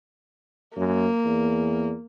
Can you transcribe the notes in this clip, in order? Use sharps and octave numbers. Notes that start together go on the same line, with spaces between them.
F#2 A#3
E2